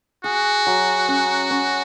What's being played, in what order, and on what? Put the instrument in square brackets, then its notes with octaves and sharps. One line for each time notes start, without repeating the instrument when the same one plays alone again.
[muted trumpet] F#4 [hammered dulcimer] G#4
[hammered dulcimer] F#3
C#4
C#4